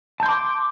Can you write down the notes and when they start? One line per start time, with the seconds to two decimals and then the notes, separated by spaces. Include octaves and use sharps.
0.20 A5
0.23 G6
0.26 C6
0.29 D6